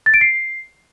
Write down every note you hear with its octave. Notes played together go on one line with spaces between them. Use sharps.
A6
D7
C7